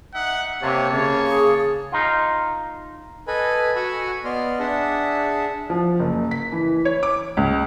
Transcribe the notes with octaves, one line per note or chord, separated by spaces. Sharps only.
D#4 E5 F#5
C3 A#3 C#5 A5
C#3 C#5
G#4
D#4 F4
A4 B4 D#5 G#5 B5
F#4 F#5 G#5 B5 C#6 E6
B3 D5 D#5 C6 F6
D4 G#4 E5 F#5 A5
F3
F#1
B6
E3
C#5
D6
C#2